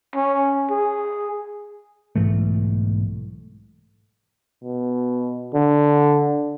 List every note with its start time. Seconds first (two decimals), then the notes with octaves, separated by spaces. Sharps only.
0.15 C#4
0.70 G#4
2.16 B1 G#2 E3 A3
4.64 B2
5.54 D3